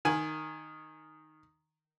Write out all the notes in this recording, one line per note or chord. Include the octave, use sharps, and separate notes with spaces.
D#3 G#5